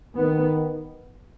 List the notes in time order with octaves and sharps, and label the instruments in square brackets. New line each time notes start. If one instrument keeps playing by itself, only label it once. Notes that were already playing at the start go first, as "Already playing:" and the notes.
[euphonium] D#3 [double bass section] B3